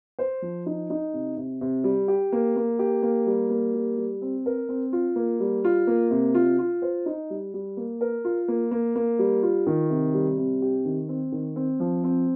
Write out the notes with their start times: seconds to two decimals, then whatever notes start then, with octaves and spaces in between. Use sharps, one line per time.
0.19 C5
0.42 F3
0.66 D#4
0.90 D#4
1.13 C3
1.37 C3
1.61 C3
1.84 G3
2.08 G4
2.32 A#3
2.56 A#3
2.79 G4
3.03 A#3
3.27 G3
3.50 A#3
3.74 G3
3.98 G3
4.22 C4
4.46 A#4
4.69 C4
4.93 F4
5.16 A#3
5.40 G3
5.64 F4
5.87 A#3
6.11 C3
6.35 F4
6.59 F4
6.82 C5
7.06 D#4
7.30 G3
7.54 G3
7.77 A#3
8.01 A#4
8.25 F4
8.48 A#3
8.71 A#3
8.96 A#3
9.19 G3
9.43 F4
9.66 D#3
9.90 C3
10.14 G3
10.38 C3
10.62 G4
10.85 D#3
11.09 C4
11.32 D#3
11.56 C4
11.80 F3
12.04 C4